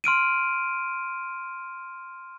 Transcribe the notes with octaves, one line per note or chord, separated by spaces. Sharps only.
C6 F6 D7 D#7